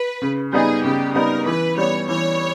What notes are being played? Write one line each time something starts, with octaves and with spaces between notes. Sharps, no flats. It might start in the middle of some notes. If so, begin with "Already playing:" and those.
Already playing: B4
C#3
G3 B3 D#4 G#4
C#3 G4
G3 B3 D#4 A#4
E3 B4
G3 B3 C#5
E3 C#5